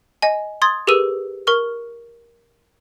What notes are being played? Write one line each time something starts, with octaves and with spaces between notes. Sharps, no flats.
D#5 G#5
C6 D#6 G#6 A6
G4 G#4 A#4 B4 E6 D#7
A#4 C#6 F6